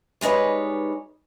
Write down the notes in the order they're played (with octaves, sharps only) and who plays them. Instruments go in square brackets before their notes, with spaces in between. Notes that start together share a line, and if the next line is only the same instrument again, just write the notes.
[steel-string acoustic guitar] G3 G#3 D#4 B4 C#5